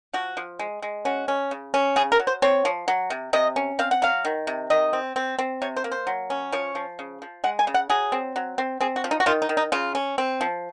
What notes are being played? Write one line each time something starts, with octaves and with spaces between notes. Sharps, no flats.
F3 F#4
F3
G#3
G#3
C#4 F#4
C#4
C#3
C#4
C#3 G#4
A#4
F#3
C5
C4 C#5
F3
F#3
C3
C3 D#5
C#4
C4 F5
F#5
F#3 F5
D#3
C3
D#3 D#5
C4
C4
C4
C3 C#5
C5
A#3
C5
F#3
C#4
F3 C#5
F3
C#3
F3
G#3 F#5
G#5
C#3
F#5
F#3 G#4
C4
F#3
C4
C4 G#4
F#4
F3
D#4
F#4
D#3 F4
D#4
D#3
D#4
C#3 F4
C#4
C4
F3